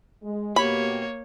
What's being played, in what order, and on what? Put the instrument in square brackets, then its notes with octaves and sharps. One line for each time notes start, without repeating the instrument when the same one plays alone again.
[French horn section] G#3
[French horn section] B2 G4 [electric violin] A#3 C#5 [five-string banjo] B5